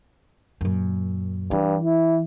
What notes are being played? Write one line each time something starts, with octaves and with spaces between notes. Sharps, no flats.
F#2 A#2
G2 E3
E4